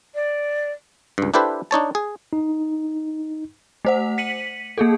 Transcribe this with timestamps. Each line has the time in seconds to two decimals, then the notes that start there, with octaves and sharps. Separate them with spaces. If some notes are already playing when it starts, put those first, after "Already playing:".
0.14 D5
1.18 C#2 G2
1.34 D4 E4 G4 A4 B4 C5
1.71 D4 D#4 C#5 A5
1.95 G#4
2.33 D#4
3.85 A3 C5 F#5
4.18 B6 C#7 D#7 F#7
4.78 A#3 G#4 A4